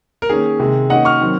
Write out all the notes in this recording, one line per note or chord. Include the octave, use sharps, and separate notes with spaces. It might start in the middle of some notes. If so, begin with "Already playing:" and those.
A#4
D#3 A#3 C#4 G#4
C3 D#3 G#3
D#3 A#3 C#4 D#5 F#5
C#6 F6
D#3 F#3 C4